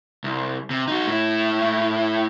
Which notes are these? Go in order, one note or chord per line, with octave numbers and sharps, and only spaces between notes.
C2
C3
D#4 F#4
A2 E4